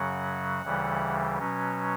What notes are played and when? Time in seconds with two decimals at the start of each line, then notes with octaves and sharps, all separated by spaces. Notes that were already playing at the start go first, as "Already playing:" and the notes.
Already playing: F#2 C#3 F#3 F#5
0.61 D2 C#3 E3 G3
1.37 B2 F#3 C#4